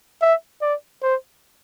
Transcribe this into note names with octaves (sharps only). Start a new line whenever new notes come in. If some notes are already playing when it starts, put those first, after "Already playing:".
E5
D5
C5